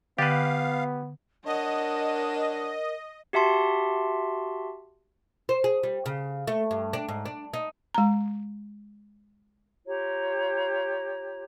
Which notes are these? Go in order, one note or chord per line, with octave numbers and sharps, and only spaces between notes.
D3 B3 G4 B4 F5 A6
D4 A#4 C#5 D#5 F#5
F#4 G4 E5 A5 C6
C5
G#4
G3
C#3
A3
G2
D4
G#2
D4
D#4
G#3 A#5
F4 G4 C#5 A#5